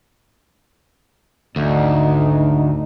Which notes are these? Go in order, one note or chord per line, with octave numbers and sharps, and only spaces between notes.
G#1 D2 D#4